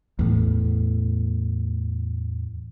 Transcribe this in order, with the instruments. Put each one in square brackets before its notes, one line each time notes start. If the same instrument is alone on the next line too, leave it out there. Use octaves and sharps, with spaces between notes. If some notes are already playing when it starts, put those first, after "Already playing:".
[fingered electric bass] E2 A2